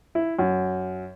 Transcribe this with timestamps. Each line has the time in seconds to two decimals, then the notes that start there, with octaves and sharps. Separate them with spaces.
0.15 E4
0.39 F#2